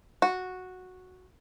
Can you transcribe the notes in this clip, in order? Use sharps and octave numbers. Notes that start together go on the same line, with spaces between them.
F#4